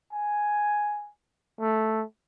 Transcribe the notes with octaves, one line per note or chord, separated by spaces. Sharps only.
G#5
A3